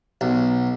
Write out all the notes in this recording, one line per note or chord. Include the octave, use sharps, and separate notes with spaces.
B1